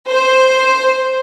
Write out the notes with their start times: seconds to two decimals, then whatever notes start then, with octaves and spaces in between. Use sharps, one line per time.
0.11 C5